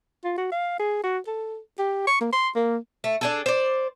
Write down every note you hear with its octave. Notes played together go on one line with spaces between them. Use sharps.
F4
F#4
F5
G#4
F#4
A4
G4
C#6
A#3
C6
A#3
A3
D4 G#4 A4
C5 D5